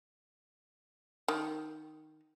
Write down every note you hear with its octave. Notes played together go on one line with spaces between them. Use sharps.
D#3